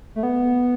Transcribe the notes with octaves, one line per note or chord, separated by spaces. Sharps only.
A3
B3